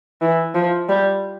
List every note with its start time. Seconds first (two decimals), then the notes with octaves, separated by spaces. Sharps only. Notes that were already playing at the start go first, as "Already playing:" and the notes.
0.22 E3
0.55 F3
0.89 G3